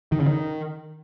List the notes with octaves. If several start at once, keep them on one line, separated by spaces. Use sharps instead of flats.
D#3
C#3
D#3